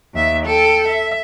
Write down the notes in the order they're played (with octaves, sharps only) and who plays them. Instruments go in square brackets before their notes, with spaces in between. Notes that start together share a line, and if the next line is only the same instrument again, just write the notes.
[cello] D#2 E5
A4 G5
E5